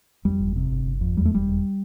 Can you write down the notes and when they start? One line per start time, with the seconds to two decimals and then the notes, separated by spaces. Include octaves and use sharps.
0.25 F2 G3
0.40 G1
0.56 C3
0.71 G1
0.86 G1
1.01 F2
1.16 E2 G3
1.25 A3
1.32 E1 G3
1.47 E1